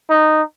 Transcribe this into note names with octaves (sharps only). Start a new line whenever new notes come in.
D#4